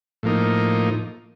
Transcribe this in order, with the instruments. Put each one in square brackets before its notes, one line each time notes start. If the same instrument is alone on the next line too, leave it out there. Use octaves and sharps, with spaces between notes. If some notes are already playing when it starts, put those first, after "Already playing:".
[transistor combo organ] A2 F3 A#3 D#4